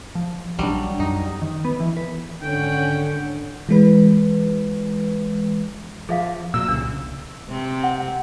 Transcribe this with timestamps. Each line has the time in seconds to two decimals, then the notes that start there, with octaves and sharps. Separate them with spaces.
0.15 F3
0.59 A#1 C#3 F#3 G3 D4
1.00 F#2 D#4
1.42 D#3
1.65 B3
1.80 E3
1.97 B4
2.42 G#1 D3 C#4 F#5 G5
3.69 E3 G#3 B4
6.09 F3 G#4 E5 F5
6.54 A#2 F#3 E6
6.68 C2 C#3 D4
7.50 C3 C4
7.84 F#5